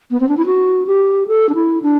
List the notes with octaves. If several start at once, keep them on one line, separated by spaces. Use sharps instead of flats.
B3
C4
D4
E4
F#4
G4
A4
D4
E4
D4